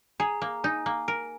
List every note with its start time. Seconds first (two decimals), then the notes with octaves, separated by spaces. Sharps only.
0.20 G#4 A#5
0.42 A#3
0.64 D#4 G#5
0.86 A#3
1.08 A#4